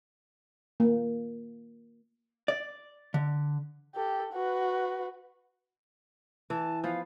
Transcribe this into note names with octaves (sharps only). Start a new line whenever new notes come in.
A#3
D5
D3
G4 A4
F#4 B4
E3 A5
F3 B3 F5